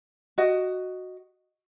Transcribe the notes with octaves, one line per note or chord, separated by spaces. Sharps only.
F#4 D#5